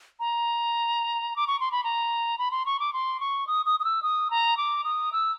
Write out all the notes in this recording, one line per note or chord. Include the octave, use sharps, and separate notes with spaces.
A#5
D6
C#6
C6
B5
A#5
B5
C6
C#6
D6
C6
C#6
D#6
D#6
D#6
E6
D#6
A#5
D6
D#6
E6